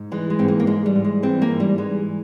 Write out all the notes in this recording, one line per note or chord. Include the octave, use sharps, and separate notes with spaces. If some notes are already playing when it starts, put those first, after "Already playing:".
Already playing: G#2
E3 G#3
G#3
G#2 C4
A#3
A#3
E3 G#3
G3
G#2
G#3
E3 C4
A#3
G#2
G3
E3 G#3